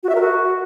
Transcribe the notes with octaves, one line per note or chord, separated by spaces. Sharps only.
F#4
E5
A#4
F#4